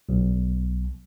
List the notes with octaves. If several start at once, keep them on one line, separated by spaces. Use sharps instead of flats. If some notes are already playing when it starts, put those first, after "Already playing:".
B1